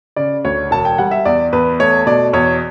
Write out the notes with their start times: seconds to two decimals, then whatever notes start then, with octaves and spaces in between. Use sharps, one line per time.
0.16 C#3 D5
0.45 D2 C#5
0.71 E1 A5
0.85 G5
0.98 G3 F#5
1.11 E5
1.25 E2 D5
1.53 E2 B4
1.80 A3 C#5
2.06 B2 D5
2.33 E2 C#5